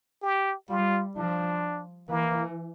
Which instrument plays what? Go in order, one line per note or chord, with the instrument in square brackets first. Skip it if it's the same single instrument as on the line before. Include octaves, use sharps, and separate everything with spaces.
[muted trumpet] G4
[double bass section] G3 [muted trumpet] F4
[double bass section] F3 [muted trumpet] D4
[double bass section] E3 [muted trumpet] A#3